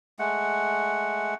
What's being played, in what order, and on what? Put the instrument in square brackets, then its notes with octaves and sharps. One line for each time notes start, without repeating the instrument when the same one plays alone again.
[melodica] G#3 A3 F#5